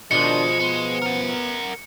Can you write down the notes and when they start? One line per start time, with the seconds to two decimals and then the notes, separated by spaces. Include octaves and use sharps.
0.11 B2 D#3 F3 G#3 D4 C#7
0.60 G#3 B3
1.02 A#4 F#5